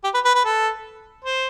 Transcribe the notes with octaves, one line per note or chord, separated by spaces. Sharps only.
G4
B4
B4
B4
A4
C5